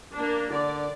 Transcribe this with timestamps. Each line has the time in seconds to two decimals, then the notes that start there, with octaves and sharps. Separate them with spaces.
0.14 A#3 D4
0.51 D3 D5